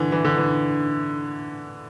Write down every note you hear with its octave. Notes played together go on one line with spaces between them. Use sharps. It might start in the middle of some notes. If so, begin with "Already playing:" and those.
Already playing: D3 E3
E3
D3
E3